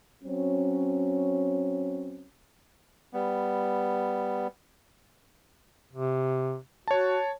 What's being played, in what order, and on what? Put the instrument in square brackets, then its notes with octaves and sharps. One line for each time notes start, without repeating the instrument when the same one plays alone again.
[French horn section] F#3 C4 C#4
[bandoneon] G3 B3
[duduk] C3
[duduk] F#4 [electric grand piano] C#5 A5